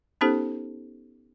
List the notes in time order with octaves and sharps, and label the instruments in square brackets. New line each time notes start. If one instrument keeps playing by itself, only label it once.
[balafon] B3 C#4 D#4 G4 A4 C5